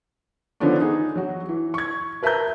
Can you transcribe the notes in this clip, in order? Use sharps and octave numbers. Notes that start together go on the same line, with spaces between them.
D3 D#3 F3 B3 C#4 D4
D#4 G#4
F#3 F#4
E3
C#6 G#6
A#4 B4 E5 A5 A#5 G6